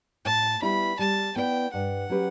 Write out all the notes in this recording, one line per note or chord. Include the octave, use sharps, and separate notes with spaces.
A2 A5
G3 B3 E4 B5
G3 A5
B3 E4 B4 D5 G5
G2 F#5
F#3 C#4 G4 B4